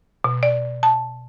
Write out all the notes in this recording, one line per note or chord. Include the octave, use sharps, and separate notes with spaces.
B2
D5
A5